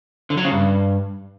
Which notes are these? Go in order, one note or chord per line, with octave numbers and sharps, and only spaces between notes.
D3
F#3
C#3
G2